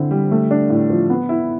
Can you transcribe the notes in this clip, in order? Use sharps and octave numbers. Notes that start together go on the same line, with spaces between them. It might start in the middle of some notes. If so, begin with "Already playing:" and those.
Already playing: D3 C4 E4
G3
A3
D4
A2
F3
B3
E4